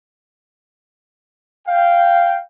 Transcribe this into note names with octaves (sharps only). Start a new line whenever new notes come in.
F5 G5